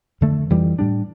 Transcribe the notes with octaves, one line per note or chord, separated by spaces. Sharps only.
F2 D3 A3
F2 E3 G3
A2 G3 D4